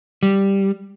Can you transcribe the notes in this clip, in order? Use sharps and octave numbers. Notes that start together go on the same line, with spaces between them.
G3